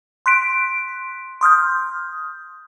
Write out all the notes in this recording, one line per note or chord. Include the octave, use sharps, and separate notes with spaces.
C6 F#6 B6 D7
C6 D#6 F6 G6